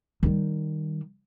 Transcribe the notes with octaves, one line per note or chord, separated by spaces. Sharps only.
D#3 G3